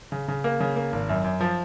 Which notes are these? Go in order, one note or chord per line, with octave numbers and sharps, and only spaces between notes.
C#3
C#3
A#3
C#3
A#3
G#1
F#2
F#2
F3